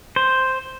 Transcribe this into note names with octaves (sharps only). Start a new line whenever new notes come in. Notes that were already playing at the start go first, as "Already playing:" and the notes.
C5